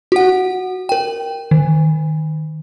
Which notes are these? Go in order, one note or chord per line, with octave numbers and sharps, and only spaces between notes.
F#4 F#5
A#4 G5
D#3